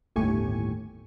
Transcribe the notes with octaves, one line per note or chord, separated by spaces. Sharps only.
G1 D#2 A2 G4 G#5 C#6